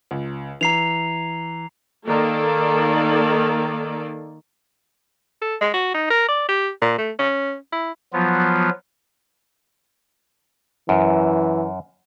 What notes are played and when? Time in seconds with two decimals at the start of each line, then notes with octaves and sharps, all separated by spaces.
0.11 C#2
0.61 E3 A#5 C7 F7
2.07 D#3 A#3 A4 D5
5.42 A4
5.61 G#3
5.74 F#4
5.94 D#4
6.10 A#4
6.28 D5
6.48 G4
6.81 A#2
6.98 A3
7.19 C#4
7.72 E4
8.13 F3 F#3 B3 F4
10.89 F#2 E3